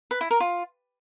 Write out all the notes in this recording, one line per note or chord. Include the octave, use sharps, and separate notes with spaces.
B4
E4
A#4
F4